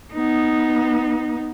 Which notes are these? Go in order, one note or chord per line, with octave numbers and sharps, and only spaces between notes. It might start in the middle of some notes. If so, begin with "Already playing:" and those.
B3 D#4